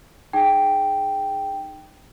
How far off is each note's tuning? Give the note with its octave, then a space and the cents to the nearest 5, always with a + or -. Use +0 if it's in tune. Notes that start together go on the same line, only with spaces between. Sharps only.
D#4 -25 G#4 +0 G5 +0